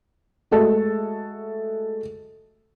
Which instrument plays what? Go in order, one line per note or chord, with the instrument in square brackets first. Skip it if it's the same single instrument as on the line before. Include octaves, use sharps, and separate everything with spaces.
[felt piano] G#3 A3 F#4 G#4 A4